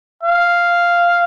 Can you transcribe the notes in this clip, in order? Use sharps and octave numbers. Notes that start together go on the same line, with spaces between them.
F5